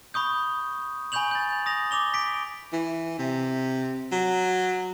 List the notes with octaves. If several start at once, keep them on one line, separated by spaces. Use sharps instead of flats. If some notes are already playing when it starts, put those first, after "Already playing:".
B5 C#6 D#6 G6
G#5 B5 C#6 G6 F7 F#7
G6 A6
D#6 A#6 F7
D6 F7 G7
B6 D7
E3
C3
F#3